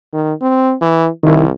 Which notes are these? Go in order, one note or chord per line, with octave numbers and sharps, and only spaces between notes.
D#3
C4
E3
C2 D#3 E4